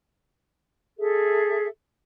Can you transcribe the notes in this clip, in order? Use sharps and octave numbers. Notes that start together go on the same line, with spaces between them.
G#4 A4 E5